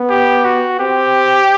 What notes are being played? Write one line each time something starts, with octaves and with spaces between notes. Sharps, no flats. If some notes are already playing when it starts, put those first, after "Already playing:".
Already playing: B3
G4
F#4
C4 G4